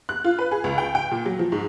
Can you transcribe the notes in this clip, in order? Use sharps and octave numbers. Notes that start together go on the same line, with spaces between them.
F#6
F4
B4
G#4
C#2
G5
G5
A#2
F#3
F3
G#2